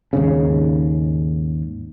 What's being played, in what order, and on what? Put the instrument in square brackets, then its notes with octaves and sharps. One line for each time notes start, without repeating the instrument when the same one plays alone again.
[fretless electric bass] D#2 G#2 C#3